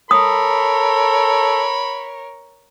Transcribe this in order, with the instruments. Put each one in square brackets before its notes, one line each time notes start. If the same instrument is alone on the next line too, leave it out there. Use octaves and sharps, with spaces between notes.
[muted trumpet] A4 [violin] A#4 C#5 [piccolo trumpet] B5 [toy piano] D#6